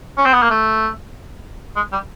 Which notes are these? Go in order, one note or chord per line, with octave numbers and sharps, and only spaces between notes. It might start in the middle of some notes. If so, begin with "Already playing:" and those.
C#4
C4
B3
A#3
A3
G#3
G3